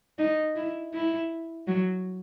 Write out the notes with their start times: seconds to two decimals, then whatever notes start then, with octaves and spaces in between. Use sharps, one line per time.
0.19 D#4
0.56 E4
0.94 E4
1.67 F#3